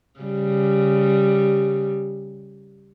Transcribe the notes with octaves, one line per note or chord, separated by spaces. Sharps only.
C#3 G3